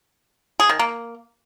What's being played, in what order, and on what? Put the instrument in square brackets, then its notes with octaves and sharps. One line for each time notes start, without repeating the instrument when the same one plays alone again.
[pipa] G#4
D#3
A#3